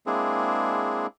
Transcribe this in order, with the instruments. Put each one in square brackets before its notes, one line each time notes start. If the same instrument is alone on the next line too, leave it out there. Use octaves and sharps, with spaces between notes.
[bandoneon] G#3 A#3 C4 D4 E4 G#4